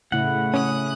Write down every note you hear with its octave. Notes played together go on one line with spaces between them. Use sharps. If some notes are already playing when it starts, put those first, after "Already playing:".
A2 C#3 A3 E4 F#5
C#4 D#6 F#6